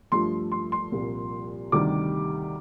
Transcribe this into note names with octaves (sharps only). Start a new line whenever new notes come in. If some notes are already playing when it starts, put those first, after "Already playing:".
G2 F3 A3 C6
C6
C6
C2 A#2 F3
D2 C3 D#3 G3 D6